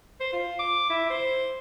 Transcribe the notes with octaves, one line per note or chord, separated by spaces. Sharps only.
C5
F4
D6
E4
C5